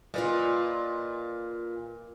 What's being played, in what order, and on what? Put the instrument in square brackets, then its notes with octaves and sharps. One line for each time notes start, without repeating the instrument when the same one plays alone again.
[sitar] A#2 [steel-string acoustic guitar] F4 B4 D#5